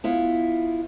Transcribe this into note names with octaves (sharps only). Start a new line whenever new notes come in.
B3 E4 F4